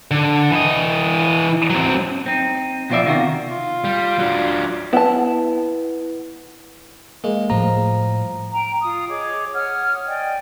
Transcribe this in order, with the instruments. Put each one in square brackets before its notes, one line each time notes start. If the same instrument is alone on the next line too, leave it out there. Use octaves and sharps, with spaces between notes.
[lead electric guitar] D3
E3 D#5
F#3 C4
[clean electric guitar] C4 D#4
B2 F3 F4 A4 D5 E5
C3 D#3 F4 F#4
[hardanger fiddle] F4
[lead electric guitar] G3
F#3 D4
[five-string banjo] B3 A5 [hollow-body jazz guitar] E4
[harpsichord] G#3 [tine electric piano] A#3
[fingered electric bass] A2 G3 A3 [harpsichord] F3 [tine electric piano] A#5
[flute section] G5 A#5
F4 D#6
G#4 C#5 D#5 D6
C#5 F#5 D#6 F6
D5 D#5 G5 G#5